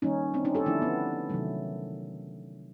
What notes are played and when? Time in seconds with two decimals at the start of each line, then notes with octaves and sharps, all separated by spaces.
0.02 D#3 G3 A#3 C#4 D#4
0.34 C4 D4
0.45 C#4 D#4
0.55 G4 A4
0.66 D3 F3 A3 D4 E4
0.82 B3
1.30 C3 D#3 F#3 A3